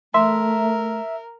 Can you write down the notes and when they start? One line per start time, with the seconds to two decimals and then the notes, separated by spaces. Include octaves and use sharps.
0.14 A3 A#4 E5 C6